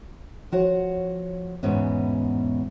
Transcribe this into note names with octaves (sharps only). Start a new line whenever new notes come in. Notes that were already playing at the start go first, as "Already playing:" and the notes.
F3 F#4 C#5 F#5
E2 G#2 B2 E3 B3 C#4